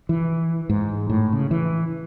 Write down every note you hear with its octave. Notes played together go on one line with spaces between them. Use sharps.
E3
G#2
A2
C#3
E3